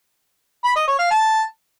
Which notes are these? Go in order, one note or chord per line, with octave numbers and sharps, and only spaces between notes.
B5
D#5
C#5
F5
A5